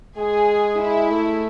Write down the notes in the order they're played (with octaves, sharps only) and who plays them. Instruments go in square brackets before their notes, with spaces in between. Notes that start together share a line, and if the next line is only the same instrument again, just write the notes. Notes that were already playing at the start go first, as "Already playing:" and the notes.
[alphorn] G#3 [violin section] G#4
[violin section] E4
[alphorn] A3